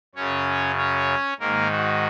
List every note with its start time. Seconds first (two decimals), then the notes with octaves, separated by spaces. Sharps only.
0.15 F#2 C#3 C#4 C#5
0.77 C#4 C#5
1.40 G#2 D#3 A#3 A#4
1.71 F#4